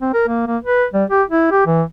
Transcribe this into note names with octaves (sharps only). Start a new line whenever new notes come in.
C4
A#4
A#3
A#3
B4
G3
G4
E4
G4
E3